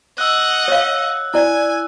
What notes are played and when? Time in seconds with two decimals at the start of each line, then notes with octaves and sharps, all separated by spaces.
0.18 D#5 F#5 E6 F#6
0.68 C#5 F5
1.34 E4 D5 G#5